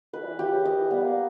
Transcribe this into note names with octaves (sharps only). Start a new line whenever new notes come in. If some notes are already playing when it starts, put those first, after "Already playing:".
D#3 B4
G3
E3
E3 G4
C#3
D#3 D#5
E3
G3 B3
A#3